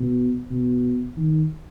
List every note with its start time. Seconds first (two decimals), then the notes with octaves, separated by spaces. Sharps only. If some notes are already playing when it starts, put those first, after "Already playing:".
Already playing: B2
0.51 B2
1.17 D#3